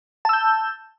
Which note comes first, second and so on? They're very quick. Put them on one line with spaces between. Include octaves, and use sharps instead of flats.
A5 E6 G6